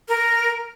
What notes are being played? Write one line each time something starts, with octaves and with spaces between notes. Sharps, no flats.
A#4